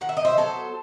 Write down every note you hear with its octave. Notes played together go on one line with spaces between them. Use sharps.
D#3 F#5
E5
D#5
C5 E5
F#3 B3 A4 C5